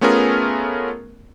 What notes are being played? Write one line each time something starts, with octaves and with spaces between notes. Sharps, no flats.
A3 B3 C#4 F4 G#4 A#4